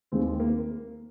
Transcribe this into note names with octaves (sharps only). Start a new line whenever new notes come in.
D#2 D#3 G#3 C4
A#3